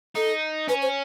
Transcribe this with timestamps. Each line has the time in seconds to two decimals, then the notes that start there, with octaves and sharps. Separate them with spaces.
0.16 D#4 A4
0.69 C#4 B4
0.82 C5